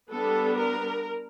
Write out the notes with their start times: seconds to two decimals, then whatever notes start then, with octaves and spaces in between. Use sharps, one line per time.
0.11 G3 B3 D4 A4
0.58 A#4